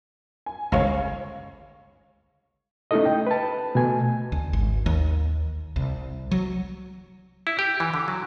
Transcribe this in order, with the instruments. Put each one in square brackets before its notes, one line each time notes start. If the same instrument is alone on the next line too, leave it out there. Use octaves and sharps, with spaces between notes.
[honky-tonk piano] G#5
[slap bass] G1 C#2 [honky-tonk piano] C#5 F5
[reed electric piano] A3 C#4 D#4 E4 A4 D#5
G5
B4 A5
B2 A3 G#5
[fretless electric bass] D2
G#1
D#2
C2
F#3
[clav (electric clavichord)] E4
G4
E3
D3
F#3